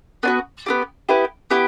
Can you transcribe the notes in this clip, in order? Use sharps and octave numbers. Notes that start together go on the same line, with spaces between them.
B3 D4 F#4
B3 E4 G4
B3 E4 G4
B3 E4 G4